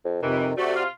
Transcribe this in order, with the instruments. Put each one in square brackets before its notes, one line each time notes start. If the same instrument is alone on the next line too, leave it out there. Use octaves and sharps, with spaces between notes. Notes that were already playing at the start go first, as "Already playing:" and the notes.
[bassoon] F2
[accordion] F2 C3 [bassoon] D#3 [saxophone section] E3
[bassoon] C3 [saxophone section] A3 [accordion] F#4 D5
[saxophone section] F4